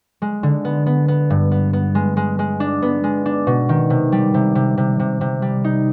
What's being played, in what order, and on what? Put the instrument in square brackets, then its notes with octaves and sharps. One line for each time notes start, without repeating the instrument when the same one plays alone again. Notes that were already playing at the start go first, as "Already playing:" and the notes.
[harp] G#3
D3
B3
B3
B3
G2
B3
B3
G#3
G#3
G#3
D4
B3
G#3
D4
B2
D#3
C3
G3
C3
C3
C3
C3
C3
G3
D#4